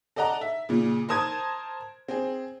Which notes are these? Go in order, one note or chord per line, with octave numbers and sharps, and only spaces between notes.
A4 D5 D#5 F#5 A#5
E5
A#2 C#3
A#4 C5 A5 D#6 G#6
C4 G#4